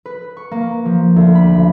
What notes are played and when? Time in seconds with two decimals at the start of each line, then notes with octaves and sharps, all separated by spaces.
0.06 B4
0.37 C#6
0.52 A#3
0.85 F3
1.16 D2
1.35 B5
1.55 B1